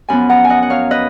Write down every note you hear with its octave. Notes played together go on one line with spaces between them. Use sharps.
F#2 F3 B3 G#5 B5
F#5 A#5
G#5
D#5 F#5
F#5
C#5 F5
B4 D#5